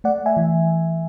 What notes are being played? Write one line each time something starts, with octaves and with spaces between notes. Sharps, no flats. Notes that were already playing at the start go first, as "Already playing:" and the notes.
A3 D5 F#5
E5 G#5
E3